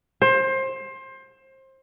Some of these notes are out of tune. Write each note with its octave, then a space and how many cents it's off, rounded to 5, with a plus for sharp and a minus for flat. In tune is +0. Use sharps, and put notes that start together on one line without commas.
C5 +25